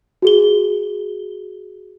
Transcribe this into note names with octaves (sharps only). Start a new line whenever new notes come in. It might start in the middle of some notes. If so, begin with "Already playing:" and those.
F#4 G#4 G7